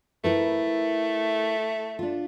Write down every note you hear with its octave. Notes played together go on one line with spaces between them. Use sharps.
A3 E4 A#4 B4
D4 F4